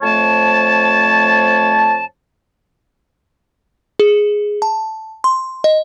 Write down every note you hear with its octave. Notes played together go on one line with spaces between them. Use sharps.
F2 A3 C5 C#5 A5
G#4
A5
C6
D#5